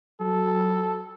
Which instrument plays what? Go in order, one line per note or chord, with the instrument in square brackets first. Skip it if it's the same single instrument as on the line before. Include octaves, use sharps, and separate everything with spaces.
[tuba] F#3 [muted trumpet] A4